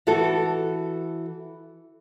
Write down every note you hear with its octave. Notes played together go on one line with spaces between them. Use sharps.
E3 F#4 A4